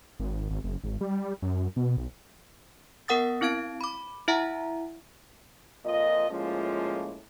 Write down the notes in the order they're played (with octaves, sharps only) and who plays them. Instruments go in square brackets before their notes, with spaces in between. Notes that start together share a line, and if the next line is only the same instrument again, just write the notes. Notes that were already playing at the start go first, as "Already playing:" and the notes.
[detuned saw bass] G#1
G#1
F#1
G#1
G3
F#2
B2
B1
[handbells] B3 A#4 F#5 D#6 A6
C4 E4 F5 G#6 D7
B5 D6
E4 E5 F#5 A#5
[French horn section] F2 A#2 F4 D#5
A2 F3 G#3 A#3 C#4 F4